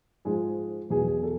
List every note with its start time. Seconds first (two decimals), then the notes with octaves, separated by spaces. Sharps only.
0.25 G#2 F3 G#3 G#4
0.90 E2 B2 F#3 G#4
1.08 G#4
1.23 A4